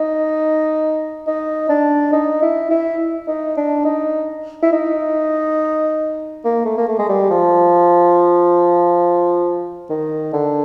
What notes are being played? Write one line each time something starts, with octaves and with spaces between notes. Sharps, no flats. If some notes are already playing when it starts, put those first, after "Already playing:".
Already playing: D#4
D#4
D4
D#4
E4
E4
D#4
D4
D#4
E4
D#4
A#3
A3
A#3
A3
G#3
G3
F3
D#3
D3